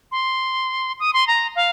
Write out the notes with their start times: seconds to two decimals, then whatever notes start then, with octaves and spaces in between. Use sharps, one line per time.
0.12 C6
1.00 D#6
1.13 C6
1.27 A#5
1.56 F5